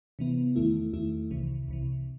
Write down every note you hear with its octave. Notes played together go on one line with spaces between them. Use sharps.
C3 E3 B3
E2 D#3 A3 E4
E2 D#3 A3 E4
C2 C3 E3
C2 C3 E3